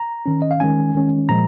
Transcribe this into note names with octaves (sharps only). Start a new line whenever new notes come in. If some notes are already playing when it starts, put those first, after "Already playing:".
Already playing: A#5
D#3 C#4
D#5
F5
D#3 G#3 C#4 G#5
D#3 G#3 C#4
A#2 F3 G#3 A#5